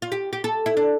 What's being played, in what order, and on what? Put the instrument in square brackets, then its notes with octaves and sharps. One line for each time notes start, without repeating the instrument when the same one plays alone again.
[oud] F4
G4
G4
A4
E4
D4